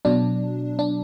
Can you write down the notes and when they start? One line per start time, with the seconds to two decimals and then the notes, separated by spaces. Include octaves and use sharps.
0.05 B2 F#3 D4
0.79 D4